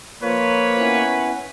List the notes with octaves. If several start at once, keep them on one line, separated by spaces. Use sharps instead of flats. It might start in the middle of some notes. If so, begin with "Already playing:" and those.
F3 A#3 F4 B4 C#5
B3 C#4 E4